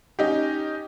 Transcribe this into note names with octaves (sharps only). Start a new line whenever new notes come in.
C#4 D#4 G4